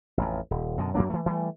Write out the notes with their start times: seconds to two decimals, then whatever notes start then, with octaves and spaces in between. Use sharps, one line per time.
0.18 A1 F2
0.51 D#1
0.78 F#2 B2 D3
0.95 F#2 F#3 A#3 D4
1.10 E3 A3
1.26 E3 G3 A3